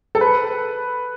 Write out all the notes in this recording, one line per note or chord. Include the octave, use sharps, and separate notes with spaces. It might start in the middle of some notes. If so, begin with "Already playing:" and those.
A4
B4